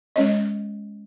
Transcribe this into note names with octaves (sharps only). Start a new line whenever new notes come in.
G#3 C#4 C#5 D#5